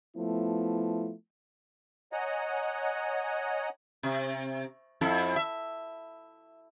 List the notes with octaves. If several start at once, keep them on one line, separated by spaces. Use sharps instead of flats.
F3 A3 B3 E4
C#5 D#5 F#5 G#5 A#5 F#6
C3
F2 E4 A4
E5